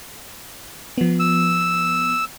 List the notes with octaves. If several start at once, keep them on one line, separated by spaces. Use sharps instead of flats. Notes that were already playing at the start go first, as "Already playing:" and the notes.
F3 B3
E6